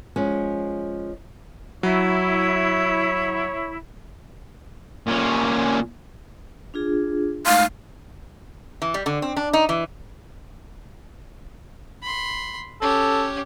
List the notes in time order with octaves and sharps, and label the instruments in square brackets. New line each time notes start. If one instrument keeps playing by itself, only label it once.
[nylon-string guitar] F3 G#3 C#4
[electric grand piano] F#3 [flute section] E4 [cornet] C#5
[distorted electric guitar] A#2 C#4
[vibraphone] D4 F4 G#4
[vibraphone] G#3 A3 D#4 [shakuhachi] F5
[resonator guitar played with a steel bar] E3
G3
D3
C4
D4
D#4
E3
[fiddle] B5 C6
[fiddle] C#4 G4 [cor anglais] A4